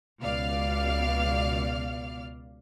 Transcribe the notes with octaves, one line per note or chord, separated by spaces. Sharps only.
C#2 B2 D5 F5 F6